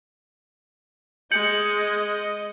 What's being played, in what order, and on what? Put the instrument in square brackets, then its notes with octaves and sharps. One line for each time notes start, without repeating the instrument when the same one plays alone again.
[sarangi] G#3 [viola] D#5 [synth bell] G6 C#7 F#7